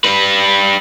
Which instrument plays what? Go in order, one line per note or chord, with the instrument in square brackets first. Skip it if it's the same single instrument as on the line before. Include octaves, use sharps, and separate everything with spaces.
[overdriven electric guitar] G3 B4